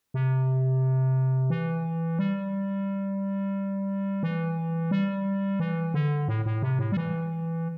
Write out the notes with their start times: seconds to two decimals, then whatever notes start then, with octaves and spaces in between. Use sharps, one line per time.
0.14 C3
1.50 E3
2.19 G3
4.23 E3
4.91 G3
5.60 E3
5.94 D3
6.28 A2
6.46 A2
6.62 C3
6.79 A2
6.92 G3
6.97 E3